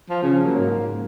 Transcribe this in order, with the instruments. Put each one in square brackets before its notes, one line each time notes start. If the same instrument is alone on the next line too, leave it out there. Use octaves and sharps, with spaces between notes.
[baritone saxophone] F3
[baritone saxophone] C#3 [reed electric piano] F3
[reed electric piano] F#3 [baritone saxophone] A#3
[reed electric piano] G#2